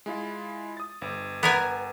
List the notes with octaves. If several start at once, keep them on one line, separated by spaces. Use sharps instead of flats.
G#3 E4 F4
D#6 A6
G1
B3 A#4 G#5